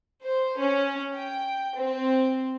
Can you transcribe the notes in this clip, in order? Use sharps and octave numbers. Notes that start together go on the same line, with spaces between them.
C5
C#4
G5
C4